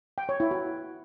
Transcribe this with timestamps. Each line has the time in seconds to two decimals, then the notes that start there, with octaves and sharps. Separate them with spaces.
0.18 G5
0.29 C#5
0.40 E4
0.51 F#4